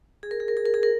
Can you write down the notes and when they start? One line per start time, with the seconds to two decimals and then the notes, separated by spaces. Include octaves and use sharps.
0.23 G#4
0.31 A#4
0.40 G#4
0.48 A#4
0.57 G#4
0.66 A#4
0.74 G#4
0.83 A#4